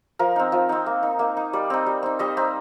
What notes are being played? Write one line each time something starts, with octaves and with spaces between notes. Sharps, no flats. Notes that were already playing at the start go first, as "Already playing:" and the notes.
F3 A#4
C4 D#4
F3
C4 D#4
A#3
D#4
A#3
D#4
G3 D5
C4 D#4
G3
C4 D#4
G3 D#5
C4 D#4